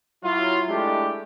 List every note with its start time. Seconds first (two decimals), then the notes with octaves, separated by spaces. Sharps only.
0.23 F#3 E4 F4
0.68 G#3 A3 D4 E4 G4